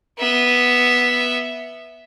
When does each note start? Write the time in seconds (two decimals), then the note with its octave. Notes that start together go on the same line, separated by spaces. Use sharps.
0.18 B3 E5